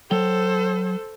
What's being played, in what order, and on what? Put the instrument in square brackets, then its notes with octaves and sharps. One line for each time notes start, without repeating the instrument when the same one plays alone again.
[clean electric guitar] F#3 C#5 G5 [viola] A4 C5